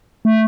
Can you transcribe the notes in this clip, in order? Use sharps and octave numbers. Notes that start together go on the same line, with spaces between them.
A3